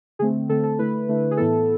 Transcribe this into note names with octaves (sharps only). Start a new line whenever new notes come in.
D3 A3 C4 G#4
D3 A3 C4 A4
A4
D3 A3 E4 B4
D3 A3 E4
G#4
A2 E3 B3 E4 A4